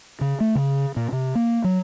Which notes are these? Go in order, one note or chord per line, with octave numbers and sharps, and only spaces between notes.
C#3
A3
C#3
A#2
C3
A#3
F#3